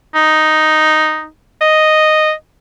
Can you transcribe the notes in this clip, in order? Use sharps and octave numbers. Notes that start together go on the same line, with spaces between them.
D#4
D#5